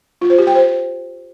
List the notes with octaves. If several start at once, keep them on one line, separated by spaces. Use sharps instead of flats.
F4
C5
G4
G5
C5